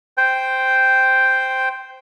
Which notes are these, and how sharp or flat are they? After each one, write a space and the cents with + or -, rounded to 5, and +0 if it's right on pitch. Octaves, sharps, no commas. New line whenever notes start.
C5 -5 G5 +0